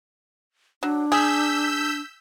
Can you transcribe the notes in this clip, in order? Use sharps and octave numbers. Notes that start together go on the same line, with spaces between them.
F#3 D4
G#4 E6 G6 B6